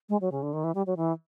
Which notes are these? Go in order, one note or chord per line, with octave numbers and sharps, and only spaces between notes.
G#3
F#3
C#3
D3
D#3
E3
G3
F#3
E3